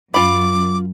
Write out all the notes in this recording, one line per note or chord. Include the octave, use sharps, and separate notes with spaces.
F#2 F4 B5 D6